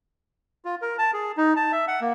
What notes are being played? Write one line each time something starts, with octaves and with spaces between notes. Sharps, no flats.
F4
A#4
A5
G#4
D#4
A5
E5
F#5
A#3